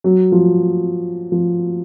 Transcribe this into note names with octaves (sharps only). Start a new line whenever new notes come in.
F#3
F3
F3